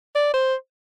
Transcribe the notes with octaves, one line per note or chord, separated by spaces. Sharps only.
D5
C5